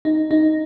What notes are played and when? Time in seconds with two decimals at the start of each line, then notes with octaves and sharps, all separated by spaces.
0.05 D#4
0.31 D#4